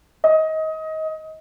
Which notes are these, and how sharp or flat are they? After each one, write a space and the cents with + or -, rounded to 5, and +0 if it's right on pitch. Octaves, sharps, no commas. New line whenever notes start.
D#5 +25